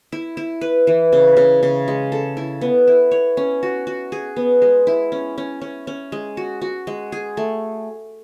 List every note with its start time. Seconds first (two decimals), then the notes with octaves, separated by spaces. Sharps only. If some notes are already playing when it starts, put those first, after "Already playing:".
0.12 E4
0.37 E4
0.61 B4
0.87 E3
1.13 C#3
1.37 C#3
1.63 C#3
1.88 G#3
2.12 A4
2.37 E4
2.61 B3
2.87 E4
3.11 C#5
3.37 C#4
3.63 F#4
3.87 F#4
4.12 G#4
4.36 B3
4.62 G#3
4.87 E4
5.12 C#4
5.38 C#4
5.62 C#4
5.87 C#4
6.12 G#3
6.37 F#4
6.62 F#4
6.87 G#3
7.12 G#4
7.37 A3